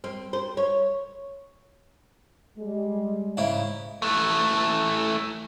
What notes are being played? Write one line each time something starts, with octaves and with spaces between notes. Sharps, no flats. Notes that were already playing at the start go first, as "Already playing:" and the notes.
C4
C5
C#5
G3 G#3
G#2 C#3 E4
E3 A3